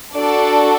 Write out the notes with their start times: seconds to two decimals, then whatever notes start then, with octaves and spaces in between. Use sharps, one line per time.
0.14 D4 F#4 A4 D5